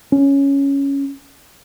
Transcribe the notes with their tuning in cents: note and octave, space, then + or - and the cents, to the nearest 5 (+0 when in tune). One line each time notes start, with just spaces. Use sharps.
C#4 +5